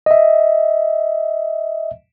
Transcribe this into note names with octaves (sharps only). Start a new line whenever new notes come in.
D#5 E5